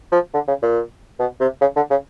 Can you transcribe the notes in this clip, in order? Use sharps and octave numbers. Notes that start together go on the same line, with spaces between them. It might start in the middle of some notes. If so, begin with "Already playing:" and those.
F3
D3
C#3
A#2
B2
C3
C#3
D3
C#3